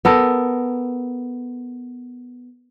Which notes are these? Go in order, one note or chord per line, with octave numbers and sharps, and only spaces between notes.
B3 A4 A#4